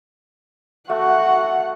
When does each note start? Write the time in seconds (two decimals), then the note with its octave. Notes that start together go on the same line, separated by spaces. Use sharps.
0.90 A3 F#4 F#5